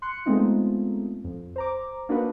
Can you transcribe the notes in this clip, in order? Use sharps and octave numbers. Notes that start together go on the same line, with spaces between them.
C6 F#6 C#7
G#3 A3 B3 C4 D#4 F4
F2
C5 A#5 D6
A#3 D4 D#4 F#4 A#4 B4